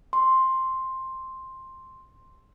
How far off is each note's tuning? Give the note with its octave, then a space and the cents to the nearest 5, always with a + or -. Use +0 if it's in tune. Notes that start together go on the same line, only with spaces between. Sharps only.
C6 +5